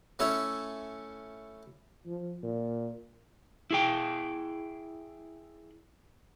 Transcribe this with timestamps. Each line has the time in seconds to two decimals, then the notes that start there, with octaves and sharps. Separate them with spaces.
0.19 A3 C#4 E4 C#5 E5
2.06 F3
2.43 A#2
3.71 E4 G#4 G5